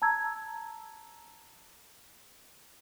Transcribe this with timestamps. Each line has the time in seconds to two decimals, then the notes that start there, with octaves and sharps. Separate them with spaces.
0.02 A5 A#5 E6 G#6